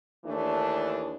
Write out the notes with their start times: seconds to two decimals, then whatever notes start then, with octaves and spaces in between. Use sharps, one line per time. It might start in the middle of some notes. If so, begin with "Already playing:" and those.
0.25 D#2 E3 A3 D4